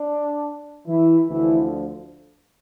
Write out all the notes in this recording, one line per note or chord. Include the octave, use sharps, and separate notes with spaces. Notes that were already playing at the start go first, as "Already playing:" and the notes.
Already playing: D4
E3 E4
D2 D3 E3 F3 E4